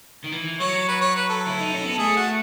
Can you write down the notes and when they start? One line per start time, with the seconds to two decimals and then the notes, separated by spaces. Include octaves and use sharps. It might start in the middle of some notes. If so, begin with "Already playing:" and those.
0.24 D#3
0.32 E3
0.60 F#3 C#5
0.88 B4
1.01 C#5
1.16 B4
1.29 A4
1.47 E4
1.60 D#4
1.72 C#4
1.85 B3
1.98 A3 G#4
2.16 F#4